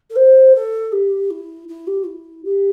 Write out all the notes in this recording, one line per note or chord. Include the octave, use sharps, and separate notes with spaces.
A4
C5
A4
G4
E4
E4
G4
E4
G4